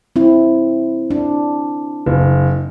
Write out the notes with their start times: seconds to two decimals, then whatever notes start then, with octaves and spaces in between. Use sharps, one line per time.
0.16 C4 E4
1.11 D4
2.06 F#1